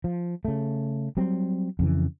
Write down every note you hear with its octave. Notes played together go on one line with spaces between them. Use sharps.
F3
C#3 A3
F#3 G3 C4
F2 C#3 E3